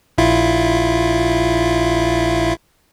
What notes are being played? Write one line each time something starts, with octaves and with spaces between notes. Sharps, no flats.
A#1 E4 F4